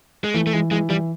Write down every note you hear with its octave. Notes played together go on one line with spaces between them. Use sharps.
G#3
E3 A3
A3
E3 G#3
E3 G#3
E3 G3